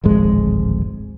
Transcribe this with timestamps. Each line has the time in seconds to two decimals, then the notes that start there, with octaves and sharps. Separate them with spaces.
0.04 D1 G#1 F2 G#3